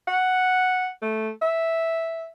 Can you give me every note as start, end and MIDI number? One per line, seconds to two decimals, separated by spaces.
0.08 0.87 78
1.02 1.31 57
1.42 2.29 76